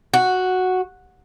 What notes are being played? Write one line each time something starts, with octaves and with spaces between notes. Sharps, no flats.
F#4